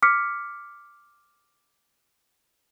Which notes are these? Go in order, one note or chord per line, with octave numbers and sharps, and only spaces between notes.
D6 F6 B6 C#7